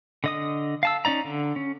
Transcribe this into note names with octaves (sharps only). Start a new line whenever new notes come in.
D3 D#5 D#6
F5 A5 E6
C#4 D#4 D5 A#5
D3
C#4